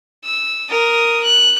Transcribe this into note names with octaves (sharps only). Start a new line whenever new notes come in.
E6
A#4 D#6
F#6